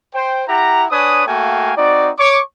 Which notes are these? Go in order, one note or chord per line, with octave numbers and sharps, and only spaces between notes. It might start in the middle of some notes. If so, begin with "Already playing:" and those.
C5 G5
E4 G4 F#5 A#5
D4 B4 C#5 G#5 D#6
A3 A#3 F#4 F5 G5 G#5
C4 D#4 F#4 D5
C#5 C#6 D6